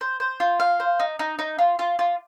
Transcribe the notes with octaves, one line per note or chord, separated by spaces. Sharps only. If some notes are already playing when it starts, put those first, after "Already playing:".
C5
C5
F4
F5
C5
D#4
D#4
D#4
F4
F4
F4